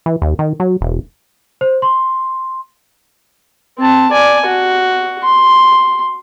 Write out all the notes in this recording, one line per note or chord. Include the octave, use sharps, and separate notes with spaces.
E3
D#2
D#3
F#3
E1
C5
C6
C4 A5
D5 G#5
F#4
C6